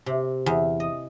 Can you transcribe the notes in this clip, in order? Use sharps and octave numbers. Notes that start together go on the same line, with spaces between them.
C3
E2
D#5